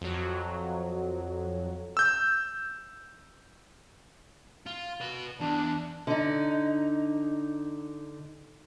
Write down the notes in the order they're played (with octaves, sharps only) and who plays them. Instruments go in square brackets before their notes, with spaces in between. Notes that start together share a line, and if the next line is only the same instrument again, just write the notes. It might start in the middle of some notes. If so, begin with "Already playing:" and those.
[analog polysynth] F2 F#3
[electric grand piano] E6 G6
[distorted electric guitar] F4
F#4 B4
[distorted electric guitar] E2 [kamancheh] D4
[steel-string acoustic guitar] D3 D#4